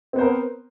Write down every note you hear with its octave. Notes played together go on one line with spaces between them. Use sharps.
B3 C4 A#4 C5